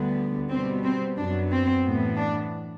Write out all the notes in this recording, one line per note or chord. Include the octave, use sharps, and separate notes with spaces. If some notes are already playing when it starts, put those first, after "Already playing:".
Already playing: D2 D3 G3 B3
B2 G3 B3 C4
C4
F#2 F#3 B3 D4
C4
A2 E3 B3
D4